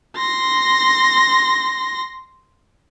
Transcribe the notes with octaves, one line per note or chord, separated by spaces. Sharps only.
C6 A#6